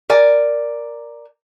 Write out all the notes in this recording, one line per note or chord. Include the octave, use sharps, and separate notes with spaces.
A#4 D5 G#5